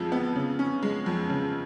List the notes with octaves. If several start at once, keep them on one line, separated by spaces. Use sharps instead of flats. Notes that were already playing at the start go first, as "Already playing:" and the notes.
Already playing: F2 F3 G#3
B3
C#3
C#4
G#3
F2
C#3